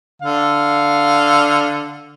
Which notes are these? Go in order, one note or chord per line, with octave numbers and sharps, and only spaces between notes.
D3 F5